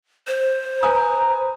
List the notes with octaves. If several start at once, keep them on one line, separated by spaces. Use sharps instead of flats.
C5
B4 G#5 A#5 D#6